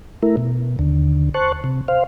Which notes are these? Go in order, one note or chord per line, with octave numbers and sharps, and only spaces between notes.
A3 E4 A#4
B2
D#2 D3
C5 A5 C#6 F#6
C3
C5 F5